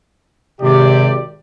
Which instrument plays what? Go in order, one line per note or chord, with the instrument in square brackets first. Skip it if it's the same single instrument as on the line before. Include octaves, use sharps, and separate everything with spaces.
[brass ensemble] G#1 G4 D5 [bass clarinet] C3